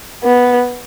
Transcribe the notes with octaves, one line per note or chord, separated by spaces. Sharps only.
B3